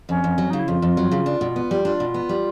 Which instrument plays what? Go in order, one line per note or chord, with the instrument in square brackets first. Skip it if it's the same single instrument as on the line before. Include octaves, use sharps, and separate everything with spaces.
[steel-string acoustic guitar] F2 [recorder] C#4
[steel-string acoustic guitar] F2
F#3
[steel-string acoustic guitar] C#3 [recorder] D#4
[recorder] E4
[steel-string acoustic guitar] F2 [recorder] F4
[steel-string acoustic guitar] F2
F#3
C#3
D4
B2
B3
G3
[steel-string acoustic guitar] D4 [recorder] F4
[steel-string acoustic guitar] B2
B3
G3